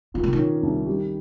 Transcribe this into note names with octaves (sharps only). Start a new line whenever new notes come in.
A#2 D#3
C#3
D#3
C#4
C2
G3